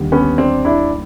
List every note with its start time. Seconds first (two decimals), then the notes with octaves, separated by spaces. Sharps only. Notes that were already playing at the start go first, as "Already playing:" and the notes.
Already playing: D#2 D3 G3
0.12 B3 C#4
0.38 C4 D4
0.65 D4 E4